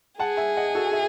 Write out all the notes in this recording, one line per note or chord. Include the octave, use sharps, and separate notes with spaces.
G#4 F#5 A5
E5 G#5
D#5 F#5
F#4 A4
E5